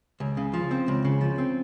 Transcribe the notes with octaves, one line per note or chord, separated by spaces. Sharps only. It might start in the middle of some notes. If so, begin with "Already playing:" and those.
C#2
C#3
F3
C4
C#2
C#3
F3
C4